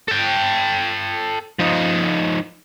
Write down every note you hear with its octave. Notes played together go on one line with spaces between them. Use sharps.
A4 G5
F3 D#4